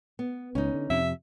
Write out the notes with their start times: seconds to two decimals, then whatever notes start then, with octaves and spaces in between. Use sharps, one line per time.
0.19 B3
0.55 C#2 C#4 D#4
0.74 D3
0.90 F2 C3 E5